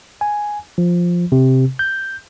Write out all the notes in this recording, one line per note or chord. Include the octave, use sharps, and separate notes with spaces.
G#5
F3
C3
G6